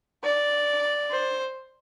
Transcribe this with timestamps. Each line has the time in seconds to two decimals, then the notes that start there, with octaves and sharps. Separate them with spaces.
0.24 D5
1.11 C5